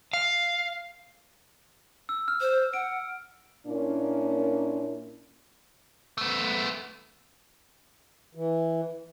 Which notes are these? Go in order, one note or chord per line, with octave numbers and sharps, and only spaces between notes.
F5
E6
F6
C5
F#5 D7
A#2 A#3 C#4 D4 E4 A#4
A3 B3
E3